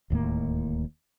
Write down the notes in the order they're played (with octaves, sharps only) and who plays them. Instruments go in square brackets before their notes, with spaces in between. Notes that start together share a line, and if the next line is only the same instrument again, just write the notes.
[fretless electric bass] D1 D#2 A2 A#3